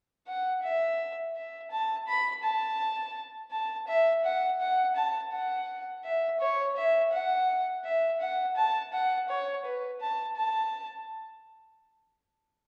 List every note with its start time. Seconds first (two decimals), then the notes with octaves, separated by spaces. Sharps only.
0.27 F#5
0.63 E5
1.36 E5
1.71 A5
2.08 B5
2.43 A5
3.51 A5
3.88 E5
4.24 F#5
4.60 F#5
4.96 A5
5.33 F#5
6.04 E5
6.40 C#5
6.76 E5
7.12 F#5
7.85 E5
8.20 F#5
8.57 A5
8.93 F#5
9.29 C#5
9.65 B4
10.01 A5
10.36 A5